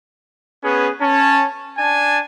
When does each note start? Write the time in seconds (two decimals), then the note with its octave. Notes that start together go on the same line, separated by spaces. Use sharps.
0.64 B3 C#4 G#4 B4
1.01 C#4 A5
1.78 D4 G#5 A5